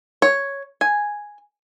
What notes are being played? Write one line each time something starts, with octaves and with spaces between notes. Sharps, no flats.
C#5
G#5